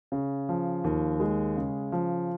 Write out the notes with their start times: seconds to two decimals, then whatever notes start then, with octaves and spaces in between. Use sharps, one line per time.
0.12 C#3
0.49 F3
0.84 D#2
1.20 G#3
1.56 C#3
1.92 F3